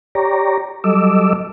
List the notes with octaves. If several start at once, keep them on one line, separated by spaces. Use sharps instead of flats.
G4 C#5 D5 A#5
F#3 G3 A4 D#5 D6 E6